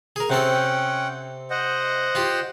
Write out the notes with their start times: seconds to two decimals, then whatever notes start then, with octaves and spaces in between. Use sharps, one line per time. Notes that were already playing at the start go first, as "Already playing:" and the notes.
0.16 G#4 A#4
0.30 C3 C4 C#4 A4 F#5 G5
1.50 C5 D#5 F#5
2.15 F4 G4